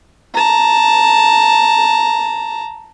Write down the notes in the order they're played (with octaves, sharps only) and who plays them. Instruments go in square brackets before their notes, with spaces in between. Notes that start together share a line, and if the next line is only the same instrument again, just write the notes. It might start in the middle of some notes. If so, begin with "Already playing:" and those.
[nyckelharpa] A5 A#5